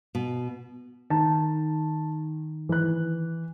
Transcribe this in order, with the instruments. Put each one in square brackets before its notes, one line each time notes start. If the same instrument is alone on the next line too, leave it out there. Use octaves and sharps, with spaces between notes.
[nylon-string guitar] B2
[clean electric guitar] D#3 [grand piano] A5
[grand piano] E3 F#6